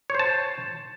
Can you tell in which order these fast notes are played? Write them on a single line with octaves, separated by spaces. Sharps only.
C#5 C5 A5